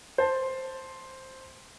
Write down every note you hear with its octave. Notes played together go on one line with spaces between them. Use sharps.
C5 A5